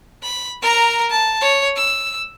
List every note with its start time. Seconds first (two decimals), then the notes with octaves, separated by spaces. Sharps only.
0.22 B5
0.62 A#4 A#5
1.10 A5
1.41 C#5
1.76 E6